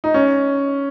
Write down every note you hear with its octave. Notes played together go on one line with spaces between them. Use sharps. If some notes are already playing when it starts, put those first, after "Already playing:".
D#4
C#4